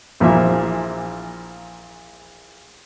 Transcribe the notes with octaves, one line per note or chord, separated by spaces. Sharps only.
A#1 A#2 E3 F3 E5